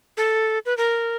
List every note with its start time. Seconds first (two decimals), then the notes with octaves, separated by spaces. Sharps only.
0.17 A4
0.66 B4
0.78 A#4